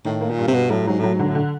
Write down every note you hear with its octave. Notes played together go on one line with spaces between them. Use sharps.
A2 D#3
A#3
A#2
G2
C3
G2 B2
A2 F#3
G#2 F#3
A2 F#3
G#2
D3
A2
D3